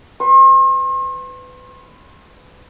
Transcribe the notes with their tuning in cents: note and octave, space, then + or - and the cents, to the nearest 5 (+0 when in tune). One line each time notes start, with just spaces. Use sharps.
B4 +30 C6 +45